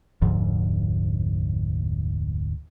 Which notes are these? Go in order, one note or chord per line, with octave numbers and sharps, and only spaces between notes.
F1 D2 G#2 F3